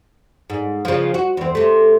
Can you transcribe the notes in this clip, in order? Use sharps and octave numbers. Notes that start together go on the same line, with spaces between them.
G#2
C#3 F3
F#4
E2 C4
C3 A3